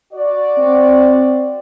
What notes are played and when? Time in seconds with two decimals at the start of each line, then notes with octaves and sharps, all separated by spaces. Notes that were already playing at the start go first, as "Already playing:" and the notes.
0.14 F#4 D5
0.58 C4